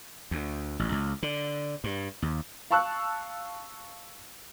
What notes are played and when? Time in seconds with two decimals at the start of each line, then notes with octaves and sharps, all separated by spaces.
0.31 D2
0.79 A1
0.92 C#2
1.23 D3
1.84 G2
2.22 D#2
2.71 F5 A5 C#6 E6 F#6